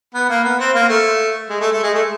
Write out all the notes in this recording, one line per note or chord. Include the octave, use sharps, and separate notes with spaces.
B3
A#3
B3
C4
A#3
A3
G#3
A3
A3
G#3
A3